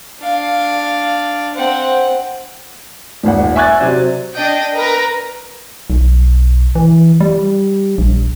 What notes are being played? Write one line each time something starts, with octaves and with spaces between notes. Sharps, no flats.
D4 F5
C4 F#5
D#1 G#1 F#5
E5 G#5 C#6 F#6 G#6 A6
C3 F#3 C5 D5
D4 D#5 G5
A#4 B4 A#5
B1
E3
G3
A#1